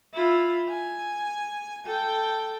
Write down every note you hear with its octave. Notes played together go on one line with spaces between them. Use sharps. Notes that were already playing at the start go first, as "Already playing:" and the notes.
E4 F4
G#5
A4 G5